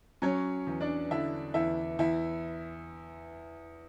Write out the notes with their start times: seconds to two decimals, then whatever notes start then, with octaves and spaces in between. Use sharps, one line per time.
0.22 F#3 C#4 C#5
0.67 E2
0.81 D4 D5
1.11 D3 E4 E5
1.54 E2 E4 E5
1.99 E2 E4 E5